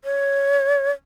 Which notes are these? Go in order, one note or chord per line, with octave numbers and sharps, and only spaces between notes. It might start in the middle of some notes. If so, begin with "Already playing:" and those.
C#5